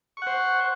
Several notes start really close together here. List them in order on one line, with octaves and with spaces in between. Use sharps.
C#6 F#5 C5